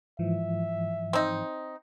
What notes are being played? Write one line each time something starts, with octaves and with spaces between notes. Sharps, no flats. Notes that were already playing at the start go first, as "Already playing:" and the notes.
G#2 E3 F3 E5
C4 D#4